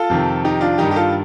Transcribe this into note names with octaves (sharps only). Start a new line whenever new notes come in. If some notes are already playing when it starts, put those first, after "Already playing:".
Already playing: F4 A4
F2 C3 D#3
D#4 G4
D4 F4
G2 D#3 G3 D#4 G4
G4
F4 A4